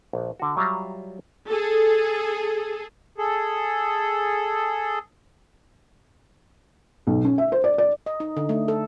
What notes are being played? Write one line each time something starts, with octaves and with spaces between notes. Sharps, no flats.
A#1
D3 F#4
F#3 G3 F4 E5 A#5
G#4 A4
G#4 A4
B1
C#4
E5
C5
D5
D5
D#5
D#4
D3
A3
A4